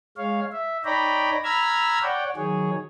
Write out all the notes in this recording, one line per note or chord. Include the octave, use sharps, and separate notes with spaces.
G#3 C#5 F5
E5
D#4 C#5 D5 G5 A#5 B5
A#5 B5 E6 F6 G#6
C#5 D5 F#5 G5
D#3 F#3 G#4 C#5